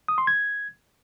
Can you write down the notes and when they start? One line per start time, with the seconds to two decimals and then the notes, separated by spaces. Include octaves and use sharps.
0.08 D#6
0.18 C6
0.27 G#6